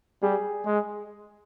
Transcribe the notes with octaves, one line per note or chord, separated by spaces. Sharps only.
G3 G#4
G#3